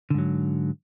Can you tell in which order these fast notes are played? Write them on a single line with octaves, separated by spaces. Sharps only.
D3 G#2 F#3